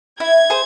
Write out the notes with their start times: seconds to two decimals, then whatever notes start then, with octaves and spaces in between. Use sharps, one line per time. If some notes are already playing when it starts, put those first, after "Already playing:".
0.20 E4 G#6
0.50 G#4 C5